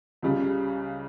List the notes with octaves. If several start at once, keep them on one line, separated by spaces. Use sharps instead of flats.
C#2 C#3 G3